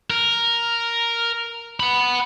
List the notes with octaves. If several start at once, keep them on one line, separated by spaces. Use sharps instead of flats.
A#4
F#5 B5